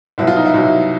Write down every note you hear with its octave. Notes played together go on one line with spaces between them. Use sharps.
C2 B2 F#3 E4
F4
D#4
E4
C2 B2 F#3